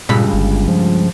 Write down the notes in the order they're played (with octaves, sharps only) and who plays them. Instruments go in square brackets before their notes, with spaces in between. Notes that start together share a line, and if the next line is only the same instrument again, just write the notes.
[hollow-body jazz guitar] C#2 G2 B5 [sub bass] A#2
[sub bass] G1
F3